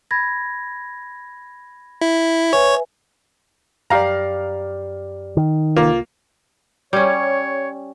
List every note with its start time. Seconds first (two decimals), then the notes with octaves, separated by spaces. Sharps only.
0.11 B5 G#6 A#6
2.01 E4
2.53 B4 C#5 E5 G#5
3.90 F#2 G4 D5 F5 A#5
5.37 D#3
5.77 C2 A#3 F4
6.93 G3 C#4 C#5